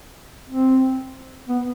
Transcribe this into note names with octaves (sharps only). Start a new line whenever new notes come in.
C4
B3